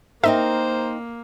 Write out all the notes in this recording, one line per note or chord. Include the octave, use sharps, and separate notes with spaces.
A#3 C4 D#4 A#4 C5 E5